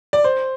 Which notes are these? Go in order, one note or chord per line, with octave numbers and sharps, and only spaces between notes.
D5
C5